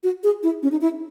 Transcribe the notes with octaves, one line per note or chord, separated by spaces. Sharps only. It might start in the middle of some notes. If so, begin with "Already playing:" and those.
F#4
G#4
E4
C#4
D#4
E4